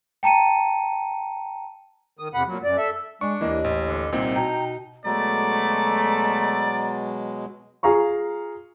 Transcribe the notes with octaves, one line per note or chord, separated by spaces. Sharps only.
G5 A5 A#5 C#7 D#7
D#3 D#6
F2 C3 F#5 B5
A#2 F#3
F#2 D5
A4 E5
G#3 D4 C#6
D#2 E3 A#3 D#5
A1
D3
C2 A#2 C4 D#4
B2 G5 A#5
B2 F#3 G#3 A3 D5 A#5
F4 G#4 F5 A#5 C#6